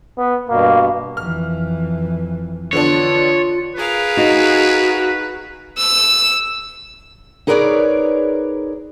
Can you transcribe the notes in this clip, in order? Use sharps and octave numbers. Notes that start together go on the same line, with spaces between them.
B3
G2 B2 A#3
F2 E3 F6
D3 B3 D4 F4 C#5
G#4 A#4 B4 F5
D#4 F#4
E6
D#4 G#4 A#4 B4 C#5 D5